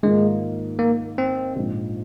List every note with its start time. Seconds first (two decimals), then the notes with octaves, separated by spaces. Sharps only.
0.03 G#2 D#3 G#3 A#3 F4
0.79 A#3
1.18 C4
1.56 A#1 G#2 F3